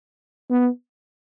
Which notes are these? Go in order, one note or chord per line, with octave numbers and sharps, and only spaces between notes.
B3